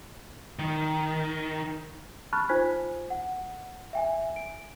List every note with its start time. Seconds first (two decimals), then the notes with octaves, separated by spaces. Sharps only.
0.59 D#3
2.33 A5 B5 C#6 F6 F#6 A6
2.49 D#4 F4 C5 G#5 G#6 B6
3.10 F#5
3.93 E5 G5 G#5
4.36 D7